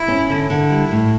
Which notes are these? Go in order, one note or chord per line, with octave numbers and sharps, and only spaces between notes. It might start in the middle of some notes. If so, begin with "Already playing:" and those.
Already playing: E4
C#4
D3 E4
D3
G3 E4
A2